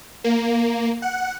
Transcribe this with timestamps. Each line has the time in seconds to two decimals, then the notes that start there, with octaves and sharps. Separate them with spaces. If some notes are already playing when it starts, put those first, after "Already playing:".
0.24 A#3
1.02 F#5